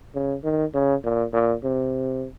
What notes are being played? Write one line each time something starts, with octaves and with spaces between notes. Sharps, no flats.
C#3
D#3
C#3
A#2
A#2
C3